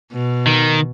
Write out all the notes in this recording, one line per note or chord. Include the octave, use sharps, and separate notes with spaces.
B2
D#3